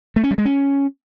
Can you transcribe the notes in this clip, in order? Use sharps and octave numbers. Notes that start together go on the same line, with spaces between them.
A3
C#4
G3
G#3
C#4